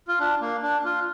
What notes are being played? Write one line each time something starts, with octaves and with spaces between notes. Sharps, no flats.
F4
D4
A#3
D4
F4